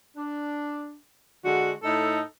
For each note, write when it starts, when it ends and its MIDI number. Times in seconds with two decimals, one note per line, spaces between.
0.16 0.95 62
1.44 1.71 50
1.44 1.71 56
1.44 1.71 66
1.83 2.19 45
1.83 2.19 63
1.83 2.19 69